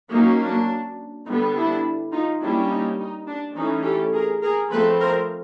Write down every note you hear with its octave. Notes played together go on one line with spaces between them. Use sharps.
F#3 A#3 C#4 D#4
D4
D3 G3 B3 D#4
D4 E4
D#4 F4
G3 A#3 C#4 D4 E4
D#4
D#4
D4
E3 A3 C#4 D#4
G4 A4
G#4 A#4
G#4 A#4
F3 A3 C4 A4 B4
A#4 C5